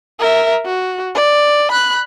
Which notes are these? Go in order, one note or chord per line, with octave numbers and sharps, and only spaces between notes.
A#4 E5
F#4
D5
B5 F#6